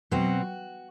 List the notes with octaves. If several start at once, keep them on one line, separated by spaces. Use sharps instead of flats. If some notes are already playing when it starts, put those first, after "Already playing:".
B2 F#3 C4 F#4